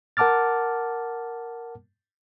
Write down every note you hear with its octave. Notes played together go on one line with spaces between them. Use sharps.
A#4 F#5 A5 D6 F6 A6